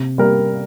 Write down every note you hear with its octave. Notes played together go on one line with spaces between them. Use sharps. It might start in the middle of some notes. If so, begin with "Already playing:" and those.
Already playing: C3
G3 A#4